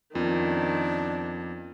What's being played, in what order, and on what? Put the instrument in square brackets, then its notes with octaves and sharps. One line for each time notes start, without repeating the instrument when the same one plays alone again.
[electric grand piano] F2 [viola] D#3 [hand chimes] B3 C#4 F4 [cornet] D4